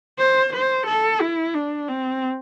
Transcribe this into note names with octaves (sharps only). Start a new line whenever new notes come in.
C5
C5
A4
E4
D4
C4